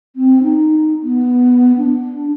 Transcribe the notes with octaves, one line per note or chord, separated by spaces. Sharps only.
C4
D#4
B3
D4